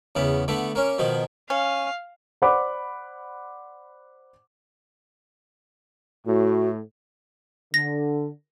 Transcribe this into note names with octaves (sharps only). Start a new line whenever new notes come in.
E2 C#3 B3
D3 A3 B3
A#3 C#4
B2 D#3 F3
C#4 F5
C5 D5 F#5 B5 D6
A2 F#4
D3 A#6